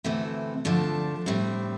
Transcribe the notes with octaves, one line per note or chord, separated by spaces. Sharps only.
D2 C3 E3 A3 C4
D2 D3 F3 A3 D4
A2 G3 C4